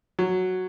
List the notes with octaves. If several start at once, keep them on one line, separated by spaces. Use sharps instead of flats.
F#3